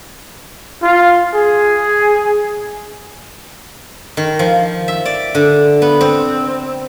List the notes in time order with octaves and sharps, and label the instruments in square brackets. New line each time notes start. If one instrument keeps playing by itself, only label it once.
[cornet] F4
G#4
[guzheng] D#3
F3
E5
D5
D3
B3
C4